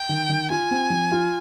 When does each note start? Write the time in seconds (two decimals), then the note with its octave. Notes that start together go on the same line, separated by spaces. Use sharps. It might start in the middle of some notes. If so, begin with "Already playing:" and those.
Already playing: G5
0.09 D#3
0.29 D#3
0.50 F4 G#5
0.71 C4
0.90 F3
1.12 F4